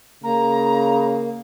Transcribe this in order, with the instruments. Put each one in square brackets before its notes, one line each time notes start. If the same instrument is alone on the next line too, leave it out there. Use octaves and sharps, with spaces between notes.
[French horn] C#3 [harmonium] A#3 [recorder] A#5